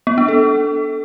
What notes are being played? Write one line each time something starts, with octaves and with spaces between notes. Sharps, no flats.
B3
D4
A4